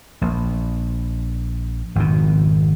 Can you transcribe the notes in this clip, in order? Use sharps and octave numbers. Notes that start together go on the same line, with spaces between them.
A#1
G#1 F2 B2